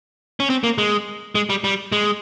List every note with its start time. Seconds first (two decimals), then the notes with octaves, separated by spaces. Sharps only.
0.40 C#4
0.50 C4
0.64 A#3
0.78 G#3
1.35 G#3
1.50 G3
1.64 G3
1.92 G#3